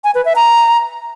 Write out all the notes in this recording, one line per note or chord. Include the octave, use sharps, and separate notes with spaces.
G#5
B4
E5
A#5